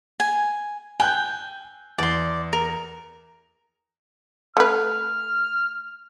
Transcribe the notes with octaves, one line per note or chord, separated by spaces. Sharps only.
G#5
G5 G#5 F#6 G6
E2 D5 C6
A#4
A3 B4 F6